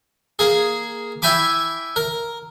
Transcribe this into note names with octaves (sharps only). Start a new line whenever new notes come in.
A#3 G#4
E4 E5 G5 G#5 B5 D6
A#4